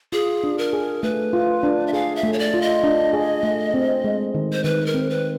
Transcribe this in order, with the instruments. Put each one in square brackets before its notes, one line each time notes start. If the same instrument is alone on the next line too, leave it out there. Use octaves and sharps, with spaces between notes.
[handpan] F4 [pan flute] G#4
[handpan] D4
[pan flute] A#4
[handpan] G#4
[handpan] A3 [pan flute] B4
[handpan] F4
D4
[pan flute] E5
[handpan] G#4 [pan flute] F5
[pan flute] E5
[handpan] A3
[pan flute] C#5
D5
[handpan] F4
[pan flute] D#5
[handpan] D4
G#4
A3
C4
G#3
D#3
[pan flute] C5
[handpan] D#3 [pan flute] B4
[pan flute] A#4
[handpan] C4
[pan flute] B4